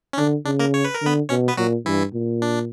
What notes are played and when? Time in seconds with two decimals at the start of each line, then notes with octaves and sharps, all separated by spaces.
0.13 C#4
0.17 D3 D4
0.45 C#3 D4
0.59 A#3 A#4
0.74 C#5
0.85 B4
0.95 A#4
1.02 D3 B3 B4
1.29 B2 C#4 C#5
1.48 B3 B4
1.57 A#2 F#3 F#4
1.86 G2 E3 E4
2.13 A#2
2.42 D4